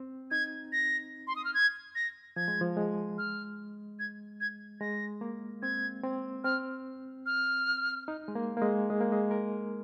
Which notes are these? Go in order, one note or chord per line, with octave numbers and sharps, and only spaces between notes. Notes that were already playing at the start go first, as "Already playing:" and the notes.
Already playing: C4
D#4 G#6
A#6
C6
D#6
F6
G#6
A#6
F3 G#6
G#3
F3
G#3
F6
G#6
G#6
G#3 A#6
A#3
C4 G#6
C4
C4 F6
F6
D#4
G#3
A#3
A#3
G#3
G#3
A#3
G#3
A#4